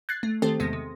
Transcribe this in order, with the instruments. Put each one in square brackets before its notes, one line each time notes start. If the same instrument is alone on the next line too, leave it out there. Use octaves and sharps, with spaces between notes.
[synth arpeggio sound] F#6 G#6 A6 C7
A3
D#3 A3 C4 G4 A4 C5
E2 C3 G#3 B3 D#6 A#6
C3